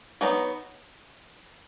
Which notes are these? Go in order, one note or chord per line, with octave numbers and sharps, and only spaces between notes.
F#3 B3 D#4